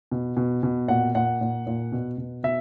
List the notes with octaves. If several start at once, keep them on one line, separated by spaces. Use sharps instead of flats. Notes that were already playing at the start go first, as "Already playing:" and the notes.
B2
B2
B2
A#2 F#5
A#2 F#5
A#2
A#2
B2
B2
B2 E5